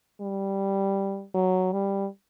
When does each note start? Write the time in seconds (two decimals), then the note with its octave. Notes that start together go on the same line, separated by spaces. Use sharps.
0.21 G3
1.35 F#3
1.72 G3